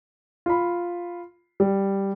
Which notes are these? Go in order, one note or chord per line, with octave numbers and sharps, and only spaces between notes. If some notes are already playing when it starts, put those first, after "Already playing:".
F4 B5
G3